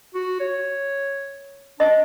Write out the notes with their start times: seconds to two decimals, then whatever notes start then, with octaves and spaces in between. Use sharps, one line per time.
0.15 F#4
0.40 C#5
1.80 D4 D#5